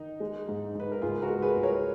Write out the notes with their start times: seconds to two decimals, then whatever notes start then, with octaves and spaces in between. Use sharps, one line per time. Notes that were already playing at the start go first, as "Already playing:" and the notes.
Already playing: D#3 D#4
0.20 G#3
0.49 G#2
0.75 G#2 B4
0.92 A#4
1.02 C#2 F4 G#4
1.16 B4
1.22 F#4 A#4
1.30 G#3
1.42 G#4 B4
1.56 C#2
1.63 A#4 C#5